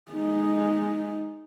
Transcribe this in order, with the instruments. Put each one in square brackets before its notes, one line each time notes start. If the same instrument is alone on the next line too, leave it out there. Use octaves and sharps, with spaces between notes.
[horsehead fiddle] G#3 D#4